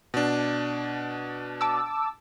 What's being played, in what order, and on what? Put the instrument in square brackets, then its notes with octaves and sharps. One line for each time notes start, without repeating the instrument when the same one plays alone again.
[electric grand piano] B2 D4
[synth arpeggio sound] A5 D6 E6